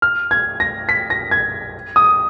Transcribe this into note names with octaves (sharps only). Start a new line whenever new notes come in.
F6
G#6
A#6
B6
A#6
G#6
D#6